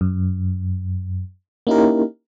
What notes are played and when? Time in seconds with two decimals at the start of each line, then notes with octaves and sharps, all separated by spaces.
0.01 F#2
1.67 A#3 C#4 D#4 E4 G4 A#4